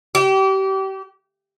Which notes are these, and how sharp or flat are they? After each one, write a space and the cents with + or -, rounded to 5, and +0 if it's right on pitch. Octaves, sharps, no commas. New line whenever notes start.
G4 -30